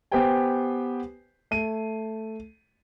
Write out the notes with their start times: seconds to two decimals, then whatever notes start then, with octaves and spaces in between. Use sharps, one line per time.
0.12 B3 G4 B4 C5 G5 G#5
1.51 A3 D#7